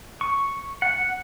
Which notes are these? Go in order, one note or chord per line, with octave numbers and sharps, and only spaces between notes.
C#6
F#5